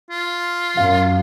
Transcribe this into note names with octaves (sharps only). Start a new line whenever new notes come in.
F4
F#2 F5